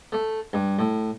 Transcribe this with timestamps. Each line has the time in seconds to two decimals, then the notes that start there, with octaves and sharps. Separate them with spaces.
0.12 A3
0.53 G2
0.79 A2